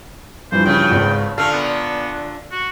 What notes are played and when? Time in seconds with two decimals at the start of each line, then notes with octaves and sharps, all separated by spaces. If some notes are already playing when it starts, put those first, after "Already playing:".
0.52 G2 E3 F3 C5
0.65 C#3 A3 G5
0.90 G#1 C#2 G#2
1.38 A#2 D3 A3 A4 F5
1.53 B3
2.52 F#4